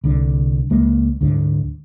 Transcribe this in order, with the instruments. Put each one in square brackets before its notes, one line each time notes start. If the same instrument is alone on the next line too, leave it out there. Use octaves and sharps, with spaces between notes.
[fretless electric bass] C2 D3
C#2 G#3 A#3
D2 G#2 D3